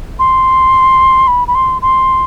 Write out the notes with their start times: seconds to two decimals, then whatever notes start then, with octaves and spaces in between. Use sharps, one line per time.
0.19 C6
1.27 B5
1.48 B5
1.55 C6
1.82 C6